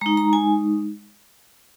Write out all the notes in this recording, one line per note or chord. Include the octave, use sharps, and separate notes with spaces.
G#3 D#4 A#5
A#5
G#5